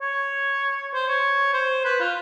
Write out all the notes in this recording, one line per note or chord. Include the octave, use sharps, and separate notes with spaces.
C#5
C5
C#5
C5
B4
F4